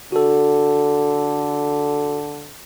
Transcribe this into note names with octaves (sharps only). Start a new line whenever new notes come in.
D3 F#4 A4